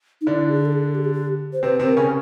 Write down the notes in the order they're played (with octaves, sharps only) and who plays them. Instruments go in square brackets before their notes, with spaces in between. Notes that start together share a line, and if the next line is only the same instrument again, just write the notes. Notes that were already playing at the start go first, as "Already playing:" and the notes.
[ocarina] D#4
[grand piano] D3 D4 [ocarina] E4
[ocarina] G#4
A4
G#4
G4
G#4
G4
C5
[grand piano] C3 C4 [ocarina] B4
[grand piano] C3 C4
[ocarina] A#4
[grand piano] C#3 C#4